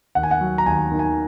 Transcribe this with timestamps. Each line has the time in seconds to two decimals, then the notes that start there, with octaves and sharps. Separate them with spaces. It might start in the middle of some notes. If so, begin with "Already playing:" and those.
0.15 D#2 F#5
0.23 G#5
0.31 F#5
0.41 F#3
0.58 A#5
0.66 D#2 G#5
0.92 D#3
0.99 G#5